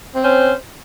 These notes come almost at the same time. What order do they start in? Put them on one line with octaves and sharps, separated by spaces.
C4 C5 C#4